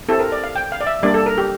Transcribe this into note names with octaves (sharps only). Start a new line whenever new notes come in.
C4 E4 G4 A4
A#4
D5
F5
G5
F5
D5
E5
G3 A#3 D4 D5
A4
A#4
G4